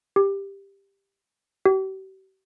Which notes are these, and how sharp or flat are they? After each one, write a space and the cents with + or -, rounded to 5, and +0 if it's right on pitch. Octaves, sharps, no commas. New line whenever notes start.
G4 +10
G4 -40